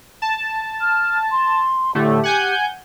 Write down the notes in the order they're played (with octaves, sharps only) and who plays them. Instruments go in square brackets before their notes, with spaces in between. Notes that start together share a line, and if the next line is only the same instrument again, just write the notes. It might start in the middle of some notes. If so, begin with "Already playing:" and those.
[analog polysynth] A5
[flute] F6
C6
[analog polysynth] A2 D3 A3 [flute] G4
[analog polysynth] F#5 G#5 G6